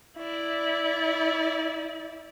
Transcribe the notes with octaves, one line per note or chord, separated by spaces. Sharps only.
E4 D5